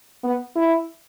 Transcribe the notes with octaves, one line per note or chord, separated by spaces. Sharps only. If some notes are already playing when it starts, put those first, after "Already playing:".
B3
E4